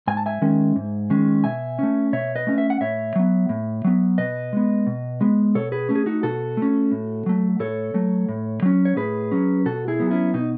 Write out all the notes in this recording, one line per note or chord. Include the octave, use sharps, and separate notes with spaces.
G#2 G#5
A5
E5 G#5
D#3 G#3 C#4
G#2
D#3 G#3 C#4
B2 E5 G#5
A3 C#4
B2 C#5 E5
B4 D#5
A3 C#4
E5
F#5
A2 C#5 E5
F#3 B3
A2
F#3 B3
B2 B4 D#5
G#3 B3
B2
G#3 B3
B2 A4 C#5
G#4 B4
A3 C#4
G#4
D#4 F#4
B2 F#4 A4
A3 C#4
A2
F#3 A3
A2 A4 C#5
F#3 A3
A2
F#3 C#4
C#5
A2 G#4 B4
F#3 C#4
B2 F#4 A4
E4 G#4
F#3 B3
C#4 E4
B2 D#4